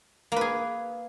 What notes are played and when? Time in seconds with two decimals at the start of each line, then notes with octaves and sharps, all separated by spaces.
0.32 A#3
0.36 B4
0.41 G#4